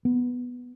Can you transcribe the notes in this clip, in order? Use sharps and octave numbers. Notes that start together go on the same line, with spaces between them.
B3